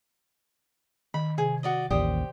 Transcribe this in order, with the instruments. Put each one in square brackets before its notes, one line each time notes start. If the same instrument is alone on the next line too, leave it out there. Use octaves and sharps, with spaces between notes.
[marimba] D#3 [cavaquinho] B5
[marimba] C3 [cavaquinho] G#4
[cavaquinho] F#4 D5 D#5
[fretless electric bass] A1 D#2 [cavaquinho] G4 C5 D#6 [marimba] D5